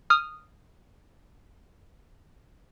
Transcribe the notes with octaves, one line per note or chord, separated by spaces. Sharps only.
D#6 F6